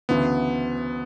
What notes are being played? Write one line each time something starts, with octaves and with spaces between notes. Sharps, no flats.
D2 C#3 E3 B3